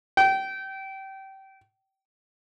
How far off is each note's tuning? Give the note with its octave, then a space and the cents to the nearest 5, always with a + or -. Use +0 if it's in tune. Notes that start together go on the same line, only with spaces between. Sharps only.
G5 -25